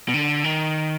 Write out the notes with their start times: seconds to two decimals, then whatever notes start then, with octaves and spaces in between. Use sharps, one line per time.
0.08 B2
0.14 D3
0.44 D#3